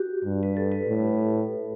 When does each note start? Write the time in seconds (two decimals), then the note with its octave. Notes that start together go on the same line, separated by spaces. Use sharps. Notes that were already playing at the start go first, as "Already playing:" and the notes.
Already playing: F#4 G4
0.24 G2
0.43 B4
0.57 A4
0.72 B4
0.88 A2